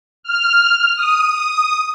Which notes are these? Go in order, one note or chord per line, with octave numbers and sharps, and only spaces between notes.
F6
D#6